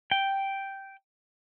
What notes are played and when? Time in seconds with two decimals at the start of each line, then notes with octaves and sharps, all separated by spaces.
0.11 G5